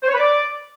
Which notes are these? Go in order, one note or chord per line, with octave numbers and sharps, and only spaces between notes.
C5
C#5
B4
D5